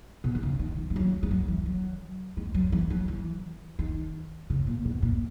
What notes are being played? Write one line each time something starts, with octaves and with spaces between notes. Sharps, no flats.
B2
D#3
C#3
D#3
E3
G#3
F#3
G#3
F#3
E3
F#3
G#3
F#3
E3
F#3
E3
D#3
C#3
A#2
B2
A#2